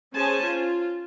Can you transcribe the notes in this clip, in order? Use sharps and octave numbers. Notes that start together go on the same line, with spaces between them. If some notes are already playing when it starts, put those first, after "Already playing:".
C#4 G#4 C5 G#5 A5
F4